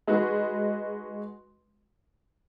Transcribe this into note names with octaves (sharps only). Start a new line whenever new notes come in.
G#3 D#4 F#4 B4